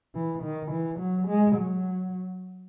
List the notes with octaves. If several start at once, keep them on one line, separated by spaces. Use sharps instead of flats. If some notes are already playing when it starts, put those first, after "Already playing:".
E3
D#3
E3
F#3
G#3
F#3